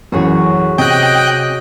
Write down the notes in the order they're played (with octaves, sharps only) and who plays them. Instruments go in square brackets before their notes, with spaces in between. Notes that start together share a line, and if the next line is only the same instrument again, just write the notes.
[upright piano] A1 F#2 [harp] F#4 G#4 C#5
[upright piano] C3 [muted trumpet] D#5 [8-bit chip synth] G5 F#6 [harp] D#6 G#6 A#6